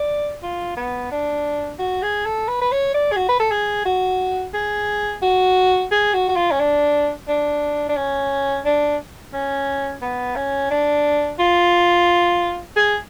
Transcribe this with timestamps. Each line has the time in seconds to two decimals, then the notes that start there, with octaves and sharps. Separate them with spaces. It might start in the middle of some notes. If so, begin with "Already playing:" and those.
Already playing: D5
0.43 F4
0.77 B3
1.12 D4
1.79 F#4
2.02 G#4
2.25 A4
2.48 B4
2.61 B4
2.71 C#5
2.94 D5
3.12 G#4
3.16 F#4
3.29 B4
3.40 A4
3.51 G#4
3.85 F#4
4.54 G#4
5.22 F#4
5.91 G#4
6.14 F#4
6.29 F#4
6.36 F4
6.51 C#4
6.60 D4
7.28 D4
7.89 D4
7.97 C#4
8.65 D4
9.33 C#4
10.02 B3
10.36 C#4
10.71 D4
11.39 F4
12.76 G#4